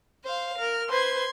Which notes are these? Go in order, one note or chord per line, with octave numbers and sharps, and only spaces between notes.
C5 F5
A#4 F6
B4 C5 C6 G#6